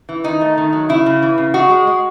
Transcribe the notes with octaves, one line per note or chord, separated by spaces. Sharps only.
E3
D#3 D#4
A3
D#3
F#3
C#3 E4
C#3
E3
C#3
G#3 F#4
G#3
G#3